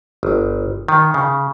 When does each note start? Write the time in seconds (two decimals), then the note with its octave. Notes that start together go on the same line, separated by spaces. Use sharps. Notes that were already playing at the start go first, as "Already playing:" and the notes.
0.23 G1
0.88 D#3
1.14 C#3